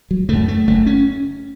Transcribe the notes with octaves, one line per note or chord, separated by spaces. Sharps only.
F#3
F#2 C#3 A3
A3
F#1 A3
C#4